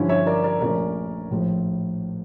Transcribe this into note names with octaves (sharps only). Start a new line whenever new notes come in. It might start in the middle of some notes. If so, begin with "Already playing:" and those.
Already playing: G2 D3 F3 C#4 E4
C#5 E5
A#4 D5
A#4 D5
A#1 A#2 F3 A3 C#4 A#4 D5
A#1 A2 F3